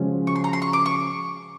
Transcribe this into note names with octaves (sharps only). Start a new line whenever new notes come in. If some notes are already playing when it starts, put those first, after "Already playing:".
Already playing: C#3 F3 G#3 C#4 F#4
C#6
C6
A#5
C6
C#6
D6
C#6